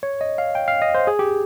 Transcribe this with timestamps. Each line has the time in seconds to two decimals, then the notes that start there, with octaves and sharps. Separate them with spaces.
0.03 C#5
0.21 D#5
0.38 F5
0.55 G5
0.68 F5
0.82 D#5
0.95 C5
1.07 G#4
1.19 G4